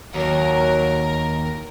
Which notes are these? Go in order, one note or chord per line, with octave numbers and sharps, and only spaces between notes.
D#2 F#3 A#4